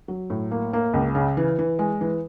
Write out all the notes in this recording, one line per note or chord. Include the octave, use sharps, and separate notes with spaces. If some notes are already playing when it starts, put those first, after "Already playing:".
F#3
A2
A#3
A#3
C#2
C#3
E3
E3
G#3
E3